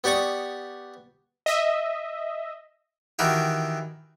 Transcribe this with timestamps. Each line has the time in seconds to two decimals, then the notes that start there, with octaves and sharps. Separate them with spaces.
0.04 B3 G4 D5 C#6 D#6
1.46 D#5 E5
3.19 D#3 E3 F#4 G4